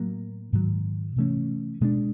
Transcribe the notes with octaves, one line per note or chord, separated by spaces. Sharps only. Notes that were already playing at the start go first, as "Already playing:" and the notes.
Already playing: A2 F#3 A#3
G#2 D#3 F#3
C3 E3 A3 C#4
B2 G#3 B3 D4